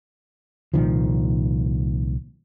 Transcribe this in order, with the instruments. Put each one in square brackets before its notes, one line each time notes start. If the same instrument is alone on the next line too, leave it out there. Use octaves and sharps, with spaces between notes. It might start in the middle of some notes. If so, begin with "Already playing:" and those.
[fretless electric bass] C2 A#2 D#3 F3